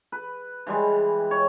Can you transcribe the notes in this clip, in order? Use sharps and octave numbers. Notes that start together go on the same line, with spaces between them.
B4
E3 G3 G#3
C#5